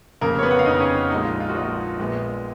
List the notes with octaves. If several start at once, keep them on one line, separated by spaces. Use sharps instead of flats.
F1 F2 C#3 A#3 A#4
C#5
B3 B4
F#5
F5
F1 F2 C#3 D#4 D#5
C#4 C#5
A#1 A#2 F3 G#3 D#4
F4
F4
F#4
A#1 A#2 F3 G#3 F4
A#1 A#2 G#3 B3